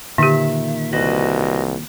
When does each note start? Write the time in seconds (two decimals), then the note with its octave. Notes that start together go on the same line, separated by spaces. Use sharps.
0.18 A#2 D3 D#3 G4 E5
0.93 C2 F#4 B4 D#5